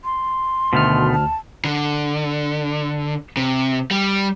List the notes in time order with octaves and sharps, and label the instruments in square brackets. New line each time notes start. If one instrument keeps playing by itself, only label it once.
[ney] C6
[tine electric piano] D2 F6 [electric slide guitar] B2 D#3 A3
[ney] A5
[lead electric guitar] D3
C3
G3